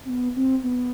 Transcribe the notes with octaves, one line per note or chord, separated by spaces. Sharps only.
C4
B3
C4
B3